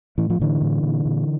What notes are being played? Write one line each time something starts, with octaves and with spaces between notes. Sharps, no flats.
A2 E3
F3
A2 D3 E3
A2
A#2
A#2